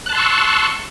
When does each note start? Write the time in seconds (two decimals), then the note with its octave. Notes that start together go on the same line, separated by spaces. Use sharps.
0.06 F#6
0.09 A5
0.12 C6
0.16 E6
0.19 C#6